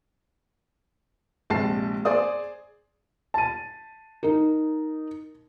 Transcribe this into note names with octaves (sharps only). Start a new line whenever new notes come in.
A#1 C3 G#3 A5 C7
G#4 C5 D5 D#6
A5 D#7
D#4 A#4